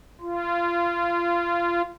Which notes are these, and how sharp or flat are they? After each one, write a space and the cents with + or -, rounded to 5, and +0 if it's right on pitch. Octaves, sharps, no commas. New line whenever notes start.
F4 -25